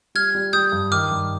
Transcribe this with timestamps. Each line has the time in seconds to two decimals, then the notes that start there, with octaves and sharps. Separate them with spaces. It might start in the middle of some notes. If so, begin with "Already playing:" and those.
0.15 G3 F6 G#6
0.35 G3
0.53 G3 D#6 G6
0.72 G2
0.91 D#3 D6 F6
1.11 G2